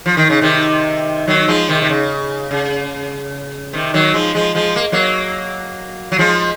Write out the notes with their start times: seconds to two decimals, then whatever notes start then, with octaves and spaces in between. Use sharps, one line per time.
0.06 F3
0.17 D#3
0.30 C#3
0.41 C3 D#3
1.28 D#3 F#3
1.48 F3 G#3
1.69 C3 D#3
1.82 C3
1.89 C#3
2.51 C#3
3.73 C3 D#3
3.94 D#3 F#3
4.14 F3 G#3
4.35 F3 G#3
4.55 F3 G#3
4.76 A#3
4.92 F#3 A#3
6.12 F#3
6.18 F3 G#3